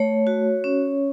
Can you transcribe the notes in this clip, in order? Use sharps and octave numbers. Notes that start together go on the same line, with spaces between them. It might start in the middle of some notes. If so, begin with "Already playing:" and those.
Already playing: A3 C#5
F#4
C#4